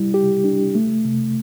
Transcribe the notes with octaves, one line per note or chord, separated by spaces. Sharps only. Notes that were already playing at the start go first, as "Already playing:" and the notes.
Already playing: G3 E4
G4
D4
A3
C3